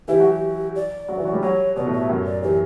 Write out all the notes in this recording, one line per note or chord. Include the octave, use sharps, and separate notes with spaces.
E3 E4 G4
F#3 F#4
D5
F#3 F#4
E3 E4
F#3 F#4
G3 G4
F#3 F#4 C#5
B2 B3 D5
A2 A3
E5
F#2 F#3
D5
E3 G4